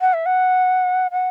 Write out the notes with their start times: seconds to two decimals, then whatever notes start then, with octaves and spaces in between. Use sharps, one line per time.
0.01 F#5
0.13 E5
0.26 F#5
1.11 F#5